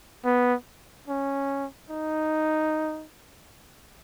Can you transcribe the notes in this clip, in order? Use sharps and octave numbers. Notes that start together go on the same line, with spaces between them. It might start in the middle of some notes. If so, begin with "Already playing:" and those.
B3
C#4
D#4